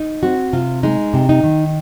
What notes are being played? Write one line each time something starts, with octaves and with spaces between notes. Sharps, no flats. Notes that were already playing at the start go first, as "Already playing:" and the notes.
Already playing: D#4
C4 F#4
C3 F4
G#3 D#4
C3
D#4
D#3